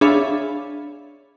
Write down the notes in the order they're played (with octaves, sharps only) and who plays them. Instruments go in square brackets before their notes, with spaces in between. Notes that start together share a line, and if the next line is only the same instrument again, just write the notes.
[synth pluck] D4 G#4 C#5 E5 F5 B5